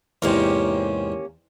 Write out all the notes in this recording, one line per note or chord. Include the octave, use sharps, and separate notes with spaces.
E2 G#2 C3 A#3 C#4 G4